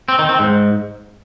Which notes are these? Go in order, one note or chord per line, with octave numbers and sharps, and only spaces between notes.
C4
D#3
C4
G#2